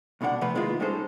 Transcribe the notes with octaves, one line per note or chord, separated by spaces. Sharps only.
C2 B2 D3 D4 F#5
C3 F3 A3 B3 B4
D#3 G#3 A#3 B3 E4 F4
G3 G#3 C#4 D#4 A4 C5